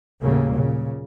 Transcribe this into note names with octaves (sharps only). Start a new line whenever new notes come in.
D#2 A2 C#3 F#3 G3 A#3
A#2 C#3